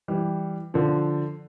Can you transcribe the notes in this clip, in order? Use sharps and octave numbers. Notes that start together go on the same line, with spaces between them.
E3 G3
D3 F3